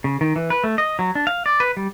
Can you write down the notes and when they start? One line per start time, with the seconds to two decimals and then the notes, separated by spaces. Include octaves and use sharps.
0.04 C#3
0.21 D#3
0.36 E3
0.50 B4
0.64 A3
0.78 D#5
0.99 F#3
1.15 D4
1.27 F5
1.46 D5
1.60 B4
1.77 G3